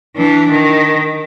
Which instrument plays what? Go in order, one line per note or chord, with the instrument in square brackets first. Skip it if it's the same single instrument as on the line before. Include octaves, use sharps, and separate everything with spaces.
[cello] E3 D4
D#3